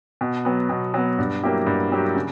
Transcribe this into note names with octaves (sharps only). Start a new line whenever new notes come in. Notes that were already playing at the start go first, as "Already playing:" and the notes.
B2
F#3 B3
B2
F#3 B3
G2
F#3 A#3 E4 G4
G2
F#3 A#3 E4 G4
C#3